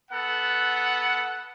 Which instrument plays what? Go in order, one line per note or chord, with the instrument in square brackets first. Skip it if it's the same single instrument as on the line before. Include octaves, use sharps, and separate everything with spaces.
[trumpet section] B3 A4 F#5